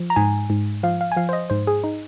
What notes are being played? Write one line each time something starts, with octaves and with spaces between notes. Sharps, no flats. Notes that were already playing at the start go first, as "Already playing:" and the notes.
Already playing: F3
A#5
G#2 G#5
G#2
F3 F5
F5
G#5
F3 F5
C5
D#5
G#2 C5
G#4
D#4